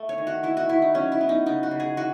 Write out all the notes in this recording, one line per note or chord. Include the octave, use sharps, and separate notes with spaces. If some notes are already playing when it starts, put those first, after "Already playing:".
Already playing: A3
C#5
D#3
F#4
A3 E4
F#4
D#3 E4
D#4
F#3 C#4
E4
B3
D#4
C#3 D#4
F#4
C#3
G#4
E3 F#4